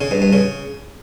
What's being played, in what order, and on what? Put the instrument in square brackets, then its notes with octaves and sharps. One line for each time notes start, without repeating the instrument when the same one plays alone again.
[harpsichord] C#3
G2
G2
C#3